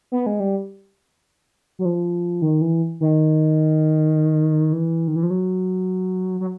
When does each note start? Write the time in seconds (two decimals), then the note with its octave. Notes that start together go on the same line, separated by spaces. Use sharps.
0.12 B3
0.26 G#3
0.40 G3
1.79 F#3
1.85 F3
2.42 D#3
2.61 E3
3.00 D#3
4.73 E3
5.08 D#3
5.16 E3
5.23 F3
5.30 F#3
6.40 F#3